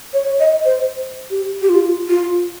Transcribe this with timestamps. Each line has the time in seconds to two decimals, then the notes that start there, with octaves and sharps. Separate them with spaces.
0.13 C#5
0.40 D#5
0.65 C5
1.30 G4
1.62 G4
1.69 F4
2.08 F4